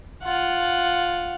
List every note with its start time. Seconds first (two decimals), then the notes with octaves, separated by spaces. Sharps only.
0.23 F4 F#5